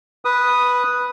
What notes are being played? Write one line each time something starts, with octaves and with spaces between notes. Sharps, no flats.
B4 D#6